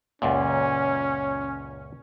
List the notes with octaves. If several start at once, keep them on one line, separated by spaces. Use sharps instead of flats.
C#2 F#2 A#2 C#4